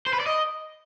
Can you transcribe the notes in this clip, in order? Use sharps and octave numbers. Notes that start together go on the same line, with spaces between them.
C5
B4
D5
D#5